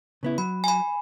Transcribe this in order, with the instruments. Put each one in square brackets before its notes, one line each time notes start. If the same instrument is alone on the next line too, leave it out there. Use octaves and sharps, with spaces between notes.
[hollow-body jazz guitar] C#3 B3 E4
[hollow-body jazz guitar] F#3 [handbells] B5
[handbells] G#5 B5